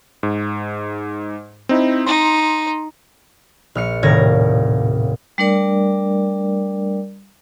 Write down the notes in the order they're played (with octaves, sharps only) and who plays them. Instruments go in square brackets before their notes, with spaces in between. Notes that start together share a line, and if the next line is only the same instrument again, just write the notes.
[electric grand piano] G#2
C4 D#4 E4
[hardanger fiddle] D#4 [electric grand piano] C6
[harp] A#1 F6 C#7
D#1 A2 C3 F5 G#6 A#6
[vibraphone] G3 A3 D4 A#4 D5